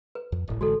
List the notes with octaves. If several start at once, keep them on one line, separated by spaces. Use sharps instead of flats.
B4
F2
D1 G1 A2
A1 D3 G#3 F#4 A4